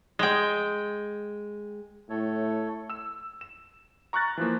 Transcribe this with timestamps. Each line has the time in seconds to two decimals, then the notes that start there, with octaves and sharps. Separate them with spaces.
0.19 G#3 G5
2.10 A2 A3 A4 C#5
2.90 E6 E7
3.41 E7
4.13 A#5 C#6 F6 F#6 A6 A#6
4.37 E3 F3 A#3